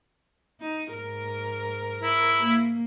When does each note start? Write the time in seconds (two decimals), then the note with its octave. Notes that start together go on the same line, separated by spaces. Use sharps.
0.61 D#4
0.91 G#2 A#4
2.03 E4
2.43 A#3